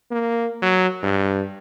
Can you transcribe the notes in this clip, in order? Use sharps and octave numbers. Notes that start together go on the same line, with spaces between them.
A#3
F#3
G2